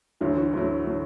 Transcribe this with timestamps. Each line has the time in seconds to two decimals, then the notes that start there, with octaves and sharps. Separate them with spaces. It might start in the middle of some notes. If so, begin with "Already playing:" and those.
0.21 D2 D3 E3 F#3
0.37 E3
0.53 D2 D3 F#3 E4
0.86 D3 F#3